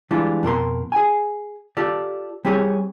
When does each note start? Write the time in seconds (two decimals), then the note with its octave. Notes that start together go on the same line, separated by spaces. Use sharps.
0.11 E3 G3 G#3 D4 F4
0.43 F2 B2 A#4 C6
0.92 G#4 G#5
1.77 F4 G4 A4 D5
2.45 G3 C4 G4 G#4 C#5